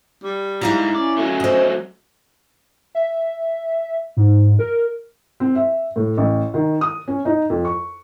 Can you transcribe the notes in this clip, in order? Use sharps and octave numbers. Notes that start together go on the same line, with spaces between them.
G3
G#2 E4 F5 A#5
C#4 D5
F#3 A3
C5 D#5
E5
G#2
A#4
C4
E5
A2
A1
D#3
D#6
C#4
D#4
F2
C#6